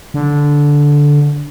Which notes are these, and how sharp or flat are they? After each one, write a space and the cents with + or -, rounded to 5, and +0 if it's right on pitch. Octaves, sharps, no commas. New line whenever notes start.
D3 -10